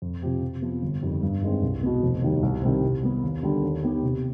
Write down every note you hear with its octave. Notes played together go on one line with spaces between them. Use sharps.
F2
C3 F3 C4 G4
C3
F3 B3 F4
G1
F2 D#3 G3
G2
D#3 G#3 C4
C2
B2 B3
F1
D#2 D#3 G3
C2
C3 D#3 G3 C4
C3
G3 B3
D#2
D3 G3
D#2
D#3 B3 D#4 G4
C3